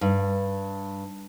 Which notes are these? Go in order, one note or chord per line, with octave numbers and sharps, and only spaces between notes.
G2